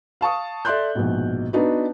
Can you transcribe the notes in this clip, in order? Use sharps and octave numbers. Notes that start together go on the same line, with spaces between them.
F5 A5 C#6 D#6
A4 D5 E5 C6 F#6 G6
A#1 G#2 B2
B3 D4 D#4 F#4 B4